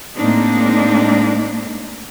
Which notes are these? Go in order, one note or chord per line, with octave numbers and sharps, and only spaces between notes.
A2 G#3 A#3 C4 D4 D#4